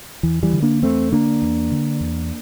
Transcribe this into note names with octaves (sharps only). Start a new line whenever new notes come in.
E2 E3
E3 G3
D3
A#3 D4
E2 A3 C4
D3 A#3 D4
E2
D3
E2